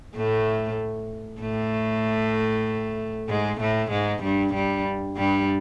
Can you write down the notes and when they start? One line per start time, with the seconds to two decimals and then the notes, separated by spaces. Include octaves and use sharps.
0.15 A2 A3
1.41 A2 A3
3.29 G#2 G#3
3.60 A2 A3
3.91 G#2 G#3
4.23 G2 G3
4.54 G2 G3
5.17 G2 G3